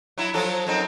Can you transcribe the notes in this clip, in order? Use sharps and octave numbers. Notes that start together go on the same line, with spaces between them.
F#3 E4
F3 F#3 A4
F#2 C4 D#4